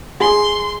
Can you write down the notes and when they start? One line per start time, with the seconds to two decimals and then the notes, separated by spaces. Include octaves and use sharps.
0.21 G#4 C6